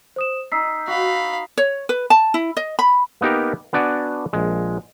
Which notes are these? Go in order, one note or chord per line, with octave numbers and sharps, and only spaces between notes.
C5 D#6 E7
D#4 E6 B6 C7
F#4 F5 B5
C#5
B4
A5
E4
D#5
B5
A#3 B3 D#4 G4 A#4
B3 D4 F#4 D5 F#5 G#5
A#1 G#3